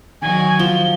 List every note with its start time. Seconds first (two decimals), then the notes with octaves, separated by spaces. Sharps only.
0.22 D#3 F#3 F#4 G#5
0.59 F3 G7